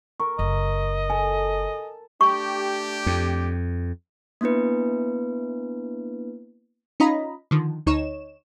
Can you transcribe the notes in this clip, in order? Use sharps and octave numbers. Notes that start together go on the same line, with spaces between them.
A#4 C#6
F#1 D#5
A4 G#5
A3 D4 G4 C#6
F2
A#3 B3 D4 E4 B4
C#4 D#4 F4 D#5 A#5 B5
D3 D#3 F3
D2 D#4 C#5 E7